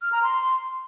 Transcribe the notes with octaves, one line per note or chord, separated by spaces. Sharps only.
F6
A#5
C6